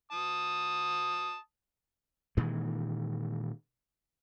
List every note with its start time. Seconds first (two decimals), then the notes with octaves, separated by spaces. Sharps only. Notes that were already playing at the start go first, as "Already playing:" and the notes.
0.12 A5 D#6
2.37 A#2 D#3 E3 G#3